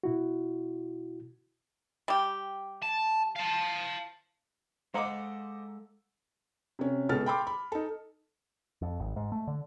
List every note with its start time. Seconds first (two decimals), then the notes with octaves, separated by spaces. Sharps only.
0.04 B2 E4 F#4
2.08 G3 G4
2.83 A5
3.36 F5 A5
4.94 G#3 A4 C5 D#5 F5 F#5 A#5 D6
6.79 C3 C#4
7.09 C#2 B2 A4 F6 A6
7.26 G5 B5 C6 D6
7.47 B5
7.72 D#4 A4
8.82 F2
8.99 G#1
9.16 G#2
9.32 A3
9.47 D3